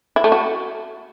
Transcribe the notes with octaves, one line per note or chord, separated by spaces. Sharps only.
E4
A3
F#4